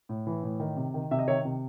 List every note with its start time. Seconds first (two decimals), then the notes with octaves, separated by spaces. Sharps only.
0.09 A2
0.27 E3
0.43 A2
0.60 D#3
0.76 C3
0.94 D#3
1.11 C3 E5
1.19 D#5
1.27 D#3 C#5 E5
1.45 C3